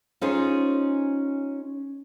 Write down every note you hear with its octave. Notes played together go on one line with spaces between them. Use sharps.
C#4 D#4 F4 G#4 C5